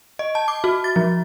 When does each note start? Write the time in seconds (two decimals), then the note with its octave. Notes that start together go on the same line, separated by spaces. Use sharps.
0.19 D#5
0.35 A5
0.48 D6
0.64 F#4
0.84 A6
0.96 F3